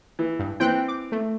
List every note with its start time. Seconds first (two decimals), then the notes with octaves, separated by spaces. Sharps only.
0.19 E3
0.39 G2
0.60 E3 C4 G5 F#6
0.88 D6
1.12 A3